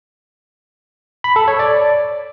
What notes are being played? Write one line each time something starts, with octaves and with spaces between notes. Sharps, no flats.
B5
A4
C#5
D5